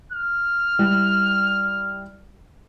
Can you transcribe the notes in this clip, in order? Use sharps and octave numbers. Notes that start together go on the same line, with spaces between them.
F6
G3 E4